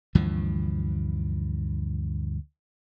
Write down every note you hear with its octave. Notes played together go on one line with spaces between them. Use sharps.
D2 G2 E3 F3